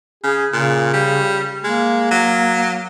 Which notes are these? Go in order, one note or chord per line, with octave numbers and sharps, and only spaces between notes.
C#3 G#4
A#2 C#3
G3
G#3 A#3
F#3